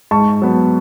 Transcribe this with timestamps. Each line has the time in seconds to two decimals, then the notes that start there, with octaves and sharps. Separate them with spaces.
0.11 G#2 A5 C#6
0.42 F#3 B3